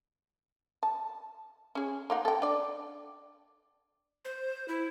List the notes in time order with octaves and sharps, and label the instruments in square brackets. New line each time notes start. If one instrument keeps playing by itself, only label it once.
[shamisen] A5
C#4 G#4
A#3 D#4 F#5
A4 G5
D4 D5
[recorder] C5
E4